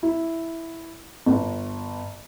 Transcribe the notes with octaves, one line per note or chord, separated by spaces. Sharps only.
E4
G1